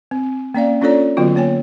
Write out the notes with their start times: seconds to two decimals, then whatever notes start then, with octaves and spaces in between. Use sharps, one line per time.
0.11 C4
0.54 A#3 C#4 D5 F5
0.81 C#4 D4 F4 A4 C#5 D5
1.17 D3 F#3 B3 F4 F#4
1.36 A#3 C#5 G#5